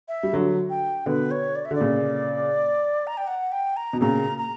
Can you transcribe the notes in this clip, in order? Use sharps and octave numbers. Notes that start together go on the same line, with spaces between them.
E5
G3
D3 F#3
G5
B2 D3 B4
C#5
D5
E5
D3 D5
A#2 C#3
A#5
G5
F#5
G5
A#5
B2
A#2 C#3 A#5
A#5